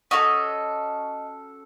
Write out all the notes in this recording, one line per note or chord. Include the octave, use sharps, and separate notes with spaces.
C#4 F#4 A4 D#5